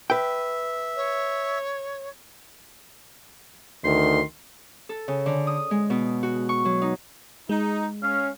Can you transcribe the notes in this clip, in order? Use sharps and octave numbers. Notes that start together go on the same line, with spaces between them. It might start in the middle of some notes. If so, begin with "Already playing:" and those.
B4 E5 G5
C#5
D2 D#3 C6
A4
C#3
D3
D#6
G#3
B2
F#4
C#6
F#3
D#4
G#3 D#4
C#4 F5